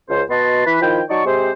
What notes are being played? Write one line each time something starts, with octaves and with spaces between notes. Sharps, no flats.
C#2 F4 C5
B2 B3 F#4 D#5 A5 C6
E3 B4 B5
D#3 F3 E4 G5
F#3 D#4 D5 A5 C#6
C3 G#3 C4 G4 C5